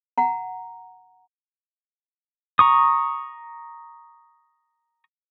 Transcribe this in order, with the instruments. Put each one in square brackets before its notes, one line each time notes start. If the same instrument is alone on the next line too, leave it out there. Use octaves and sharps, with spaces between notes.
[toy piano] F#5 A#5
[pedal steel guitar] A#5 C#6 D#6